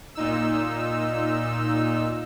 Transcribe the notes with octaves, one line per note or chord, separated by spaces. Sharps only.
A#2 D#4 E6